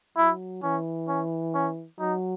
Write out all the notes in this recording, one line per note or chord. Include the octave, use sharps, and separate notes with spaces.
F#3 E4
E3 C#4
C#4
C#4
F#3 D#4